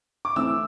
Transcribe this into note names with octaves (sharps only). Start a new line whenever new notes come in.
D6
E3 A3 C4 E6